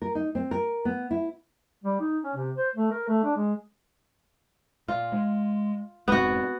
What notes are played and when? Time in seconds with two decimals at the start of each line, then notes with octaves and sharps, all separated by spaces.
0.02 A#4
0.15 D#4
0.35 C4
0.51 A#4
0.85 B3
1.11 E4
1.84 G3
2.00 D#4
2.23 C#4
2.36 C3
2.56 C5
2.75 A3
2.91 A#4
3.08 A3
3.24 D4
3.36 G#3
4.88 A#2 F4
5.12 G#3
6.08 F1 G#2 B3 C4 F#4